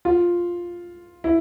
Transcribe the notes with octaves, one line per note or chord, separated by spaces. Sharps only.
F4
E4